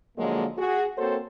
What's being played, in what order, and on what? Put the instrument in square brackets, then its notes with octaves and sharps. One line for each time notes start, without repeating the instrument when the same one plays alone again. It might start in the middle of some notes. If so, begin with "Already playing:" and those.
[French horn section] D3 F3 F#3 G#3 A#3
F#4 G#4
A#3 C4 F#4 A4 C5 C#5